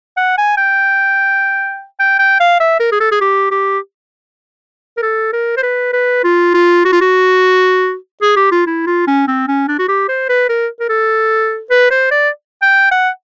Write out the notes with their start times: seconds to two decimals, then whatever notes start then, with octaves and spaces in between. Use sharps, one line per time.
0.17 F#5
0.38 G#5
0.57 G5
2.00 G5
2.19 G5
2.40 F5
2.60 E5
2.80 A#4
2.92 G#4
3.00 A4
3.12 G#4
3.21 G4
3.51 G4
4.97 A#4
5.02 A4
5.33 A#4
5.57 C5
5.63 B4
5.93 B4
6.24 F4
6.54 F4
6.85 F#4
6.93 F4
7.01 F#4
8.22 G#4
8.36 G4
8.52 F4
8.67 E4
8.87 F4
9.07 C#4
9.28 C4
9.48 C#4
9.68 D4
9.79 F#4
9.88 G4
10.09 C5
10.29 B4
10.49 A#4
10.80 A#4
10.90 A4
11.70 B4
11.91 C5
12.11 D5
12.62 G5
12.91 F#5